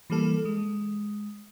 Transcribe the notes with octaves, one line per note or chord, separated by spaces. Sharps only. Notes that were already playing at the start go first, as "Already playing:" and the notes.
E3 G3 A#3 A4
G#3